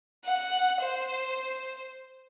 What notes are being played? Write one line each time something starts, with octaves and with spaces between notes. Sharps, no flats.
F#5
C5